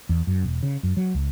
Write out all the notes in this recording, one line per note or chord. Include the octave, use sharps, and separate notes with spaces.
E2
F#2
E1
C#3
F#2
F#3
C#2